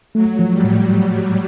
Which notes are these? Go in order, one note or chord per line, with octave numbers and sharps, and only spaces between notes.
F#3 A3
F3
G3
A2